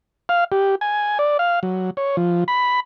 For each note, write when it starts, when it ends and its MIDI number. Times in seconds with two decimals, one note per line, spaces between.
0.29 0.44 77
0.52 0.75 67
0.81 1.18 80
1.19 1.37 74
1.39 1.60 77
1.63 1.90 54
1.97 2.16 73
2.17 2.44 53
2.48 2.80 83